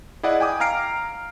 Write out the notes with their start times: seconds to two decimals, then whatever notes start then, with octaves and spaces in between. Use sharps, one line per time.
0.23 E4 G#4 D5 D#5 F#5
0.40 G5 G#5 D6 D#6
0.60 F5 A#5 F6 C7 D7